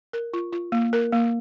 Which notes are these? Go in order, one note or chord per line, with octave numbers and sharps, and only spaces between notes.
A#4
F4
F4
A#3
A#4
A#3